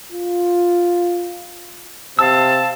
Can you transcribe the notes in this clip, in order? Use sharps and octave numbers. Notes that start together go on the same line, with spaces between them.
F4
C3 F5 A5 E6